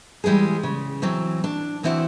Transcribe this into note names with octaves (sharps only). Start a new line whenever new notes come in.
E3 G3 G#3 B3 G#4
C#3
E3 F#3 C4
D4
E2 E3 C4 E4 F#4 F#5